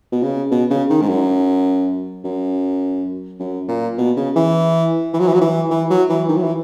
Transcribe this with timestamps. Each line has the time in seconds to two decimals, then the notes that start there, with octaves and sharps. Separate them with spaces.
0.12 B2
0.23 C#3
0.51 B2
0.70 C#3
0.90 D#3
1.01 G#2
1.09 F#2
2.24 F#2
3.40 F#2
3.68 A#2
3.98 B2
4.17 C#3
4.36 E3
5.13 E3
5.20 F#3
5.27 E3
5.34 F#3
5.41 E3
5.70 E3
5.90 F#3
6.09 E3
6.28 D#3
6.36 F#3
6.43 E3